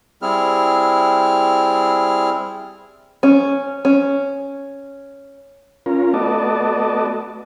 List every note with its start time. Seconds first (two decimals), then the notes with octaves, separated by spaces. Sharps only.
0.22 G3 C4 E4 G#4 F6
3.23 C#4
3.85 C#4
5.86 C#4 F4 A#4
6.13 A3 B3 F#4 D5 D#5 A5